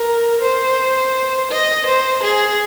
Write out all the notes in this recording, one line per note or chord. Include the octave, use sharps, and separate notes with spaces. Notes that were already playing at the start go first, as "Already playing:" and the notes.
Already playing: A#4
C5
D#5
C5
G#4